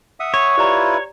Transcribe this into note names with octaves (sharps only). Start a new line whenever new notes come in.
E5 F#5 D#6
C#5
E4 F4 G4 B4 D5 A#5